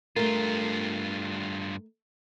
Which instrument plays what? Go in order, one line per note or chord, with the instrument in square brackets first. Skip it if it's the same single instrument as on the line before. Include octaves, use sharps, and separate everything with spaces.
[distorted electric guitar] G2 F4 [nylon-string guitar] A3 A#4